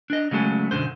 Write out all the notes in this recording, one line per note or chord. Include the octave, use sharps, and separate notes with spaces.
D4 D#5
C#3 F#3 G#3 A3
B1 F#2 D3 C5